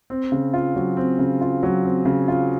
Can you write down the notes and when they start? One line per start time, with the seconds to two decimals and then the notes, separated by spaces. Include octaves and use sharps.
0.10 C4
0.32 C#3
0.54 F4
0.76 F#3
0.97 C4
1.19 C#3
1.41 F4
1.63 F#3
1.85 C4
2.05 C#3
2.28 F4